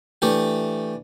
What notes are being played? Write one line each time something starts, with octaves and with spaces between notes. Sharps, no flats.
E3 A3 D4 G4